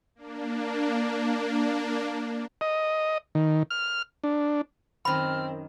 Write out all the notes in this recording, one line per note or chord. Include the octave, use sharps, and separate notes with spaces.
A#3 D4
D#5
D#3
F6
D4
F#2 D#3 C4 B5 F6